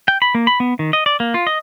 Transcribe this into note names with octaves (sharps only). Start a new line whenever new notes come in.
G5
B5
A#3
B5
B3
D#3
D#5
D5
A#3
F4
D#5